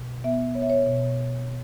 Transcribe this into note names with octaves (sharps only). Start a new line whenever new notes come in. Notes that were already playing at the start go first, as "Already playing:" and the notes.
Already playing: B2
B3 E5
B3 C#5
E5
C#5
B2